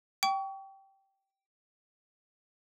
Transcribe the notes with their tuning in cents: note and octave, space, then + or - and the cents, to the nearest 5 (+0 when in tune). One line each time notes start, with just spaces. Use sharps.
G5 -10 C#6 +35